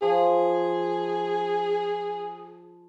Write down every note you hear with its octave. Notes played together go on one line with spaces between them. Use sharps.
F3 G#4